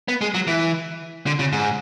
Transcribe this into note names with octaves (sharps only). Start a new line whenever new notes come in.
B3
G#3
F#3
E3
D3
C#3
G#2